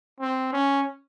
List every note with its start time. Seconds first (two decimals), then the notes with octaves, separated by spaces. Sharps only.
0.20 C4
0.53 C#4